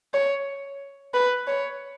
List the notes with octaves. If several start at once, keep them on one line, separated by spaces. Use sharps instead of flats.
C#5
B4
C#5